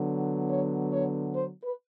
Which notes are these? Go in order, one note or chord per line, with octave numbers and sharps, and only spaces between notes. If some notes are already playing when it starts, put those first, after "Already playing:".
Already playing: D3 F#3 B3
C#5
C#5
C5
B4